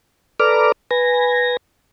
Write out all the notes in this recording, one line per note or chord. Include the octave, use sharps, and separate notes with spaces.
A4 B4 D5 A#5 D6 F6
B4 G#5 A#6